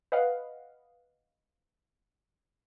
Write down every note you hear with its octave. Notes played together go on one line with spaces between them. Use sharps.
B4 D#5 F5 F#5